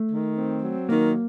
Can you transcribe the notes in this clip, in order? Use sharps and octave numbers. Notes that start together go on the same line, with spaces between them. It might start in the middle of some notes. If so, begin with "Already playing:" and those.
Already playing: A3
D#3
C4
F#3
D#3 A#3